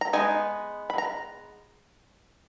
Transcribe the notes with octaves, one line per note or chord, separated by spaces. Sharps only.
A#5
G#3 B3 D#4 G#5
B5
A#5